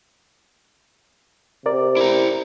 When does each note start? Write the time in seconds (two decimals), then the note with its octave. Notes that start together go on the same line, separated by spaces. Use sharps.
1.66 C3 A#4 D5
1.97 E4 A#5